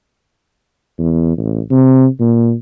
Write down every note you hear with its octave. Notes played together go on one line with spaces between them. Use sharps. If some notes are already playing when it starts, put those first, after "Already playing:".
E2
A1
C3
A#2